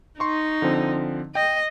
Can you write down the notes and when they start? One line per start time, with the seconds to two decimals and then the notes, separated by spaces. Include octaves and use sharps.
0.20 D#4 C6 C#6
0.62 D3 F3 C4
1.35 D#5 G5